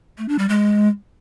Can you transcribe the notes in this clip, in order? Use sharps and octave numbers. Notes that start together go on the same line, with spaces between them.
A3
D4
G3
G#3